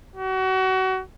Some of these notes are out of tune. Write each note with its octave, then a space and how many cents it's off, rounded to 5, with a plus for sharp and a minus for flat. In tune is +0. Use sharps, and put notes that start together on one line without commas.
F#4 +30